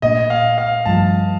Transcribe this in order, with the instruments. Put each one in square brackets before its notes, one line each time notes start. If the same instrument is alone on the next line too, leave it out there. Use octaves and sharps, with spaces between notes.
[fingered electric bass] A#2 A3 D4 [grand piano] D#5
[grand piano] F5
F5
[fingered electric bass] G2 F3 A3 [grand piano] A5